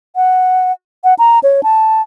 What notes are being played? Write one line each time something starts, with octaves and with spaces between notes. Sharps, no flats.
F#5
F#5
A#5
C#5
A5